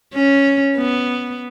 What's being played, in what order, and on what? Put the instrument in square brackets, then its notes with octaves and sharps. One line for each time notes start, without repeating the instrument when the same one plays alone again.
[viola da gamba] C#4
B3